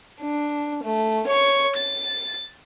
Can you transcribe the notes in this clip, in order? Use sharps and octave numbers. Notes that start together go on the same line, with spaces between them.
D4
A3
C#5 C#6
A6